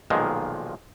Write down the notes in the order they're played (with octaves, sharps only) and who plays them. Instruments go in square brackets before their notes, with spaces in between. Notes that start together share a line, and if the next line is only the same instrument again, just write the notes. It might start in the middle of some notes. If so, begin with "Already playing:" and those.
[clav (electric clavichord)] B1 A#2 D#3 F3 G#3